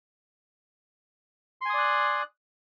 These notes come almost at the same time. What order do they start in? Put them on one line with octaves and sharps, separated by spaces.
C6 G#5 D#6 D5 F#6